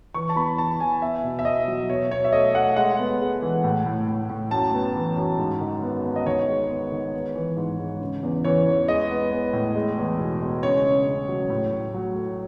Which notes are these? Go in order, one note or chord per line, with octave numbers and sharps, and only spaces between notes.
E3 C#6
A5
E2 B5
E2 A5
E2 G#5
B3 E5
B2
E5
B2 D#5
F#3
B2 C#5
B2 C#5
E5
A3 D#5
A3 F#5
G#3 F#5
B3
G#3
E3
A2
A2
A2
A2
F#2 A5
B3
E3
F#2
G#2
D#3
B3
B3
D#5
D#3 C#5
G#3
B3
D#3
B3
E3
G#2
G#2
C#3
E2
E3 C#5
E2
G#3 D#5
B3
B3
A2
G#3
E2
B2
G#3
C#3 C#5
C#3
C#3
F#3
A2
A2
F#3
A3